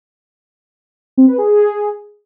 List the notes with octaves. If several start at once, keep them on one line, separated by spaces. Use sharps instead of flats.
C4
B4
G#4